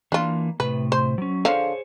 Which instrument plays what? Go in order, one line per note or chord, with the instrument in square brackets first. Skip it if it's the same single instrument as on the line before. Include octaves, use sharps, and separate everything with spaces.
[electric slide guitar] E3 A#3 [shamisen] D4 F4
[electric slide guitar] A2 C3 [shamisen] B4
[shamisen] C5
[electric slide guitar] F#3 C#4
[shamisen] D3 F3 F5 [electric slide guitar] G#4 C5 C#5